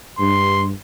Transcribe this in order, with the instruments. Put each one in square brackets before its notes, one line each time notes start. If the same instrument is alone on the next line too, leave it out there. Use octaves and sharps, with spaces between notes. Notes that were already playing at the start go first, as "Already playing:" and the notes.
[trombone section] G2 [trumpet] C6